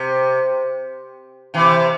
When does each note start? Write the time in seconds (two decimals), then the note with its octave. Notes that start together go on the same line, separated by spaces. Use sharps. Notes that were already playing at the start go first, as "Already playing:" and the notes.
Already playing: C3
1.54 C3 E3